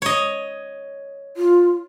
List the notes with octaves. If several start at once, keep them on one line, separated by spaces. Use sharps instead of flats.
C#5 D#5
F4